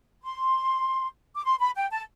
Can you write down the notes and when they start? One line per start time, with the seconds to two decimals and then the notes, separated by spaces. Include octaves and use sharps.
0.23 C6
1.36 D6
1.45 C6
1.60 B5
1.76 G5
1.91 A5